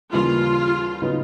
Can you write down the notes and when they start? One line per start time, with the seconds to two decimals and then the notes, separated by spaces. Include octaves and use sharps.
0.13 D#2 C#3 E3 G3 A#3 F4
1.02 C#3 F#3 B3 D#4